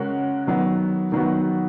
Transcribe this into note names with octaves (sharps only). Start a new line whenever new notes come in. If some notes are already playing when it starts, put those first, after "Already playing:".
Already playing: C#3 G#3 C#4 F#4 A#4
D#3 F#3 B3 F#4
D#3 F#3 B3 F#4